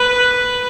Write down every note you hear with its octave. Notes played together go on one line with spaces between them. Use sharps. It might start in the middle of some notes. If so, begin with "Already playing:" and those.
Already playing: B4